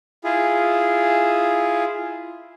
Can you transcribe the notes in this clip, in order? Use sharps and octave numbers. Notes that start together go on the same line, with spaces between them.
E4 F4 G#4